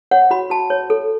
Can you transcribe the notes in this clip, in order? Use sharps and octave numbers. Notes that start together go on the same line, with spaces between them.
C#5 F#5
F#4 B5
F#4 A5
C#5
A4